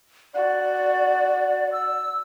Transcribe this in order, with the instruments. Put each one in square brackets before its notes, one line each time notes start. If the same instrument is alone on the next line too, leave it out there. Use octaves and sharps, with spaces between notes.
[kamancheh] F#4 [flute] D5
[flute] E6